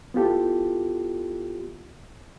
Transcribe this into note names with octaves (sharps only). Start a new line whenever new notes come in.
B3 E4 F4 G4 A4